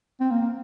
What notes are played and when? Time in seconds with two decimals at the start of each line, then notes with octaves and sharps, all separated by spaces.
0.20 C4
0.31 A#3
0.41 A#3